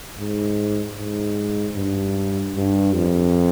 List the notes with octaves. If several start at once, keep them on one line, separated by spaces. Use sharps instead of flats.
G#2
G#2
G2
G2
F2